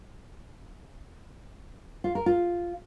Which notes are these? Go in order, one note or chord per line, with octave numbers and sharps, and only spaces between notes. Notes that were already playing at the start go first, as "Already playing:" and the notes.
F4
A#4
F4